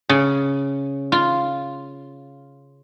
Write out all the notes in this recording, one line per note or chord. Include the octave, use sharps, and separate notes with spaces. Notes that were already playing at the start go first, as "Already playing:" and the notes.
C#3
F4